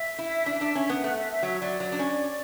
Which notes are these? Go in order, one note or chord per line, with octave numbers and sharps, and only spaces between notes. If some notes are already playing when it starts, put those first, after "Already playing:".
Already playing: E5
E4
D4
D4
C#4
B3
A3 F#5
E5
E5
F#3 E5
F#3 D5
F#3
D4
C#4